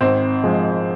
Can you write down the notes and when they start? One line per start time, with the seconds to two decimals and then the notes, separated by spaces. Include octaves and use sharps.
0.01 G#1 C4
0.44 F3 G#3